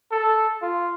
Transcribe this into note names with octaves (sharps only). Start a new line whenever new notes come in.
A4
F4